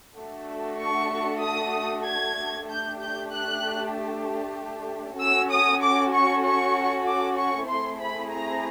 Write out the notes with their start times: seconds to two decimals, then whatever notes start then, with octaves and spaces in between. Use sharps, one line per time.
0.19 A3 D4 F#4 A4
0.82 C#6
1.44 D#6
2.07 G#6
2.69 A3 D4 G4 G6
3.01 G6
3.32 F#6
5.19 C#4 F#4 A4 E6
5.50 D#6
5.82 D6
6.13 C#6
6.44 C#6
7.07 D6
7.38 C#6
7.69 A3 C4 E4 G#4 C6
8.01 B5
8.31 A#5